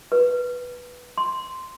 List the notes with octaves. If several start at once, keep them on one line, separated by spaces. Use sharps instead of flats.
B4
C6